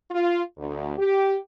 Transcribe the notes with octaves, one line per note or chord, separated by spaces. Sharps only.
F4
D2
G4